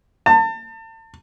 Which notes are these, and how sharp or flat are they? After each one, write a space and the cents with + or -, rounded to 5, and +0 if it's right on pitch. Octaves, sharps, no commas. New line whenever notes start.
A5 +35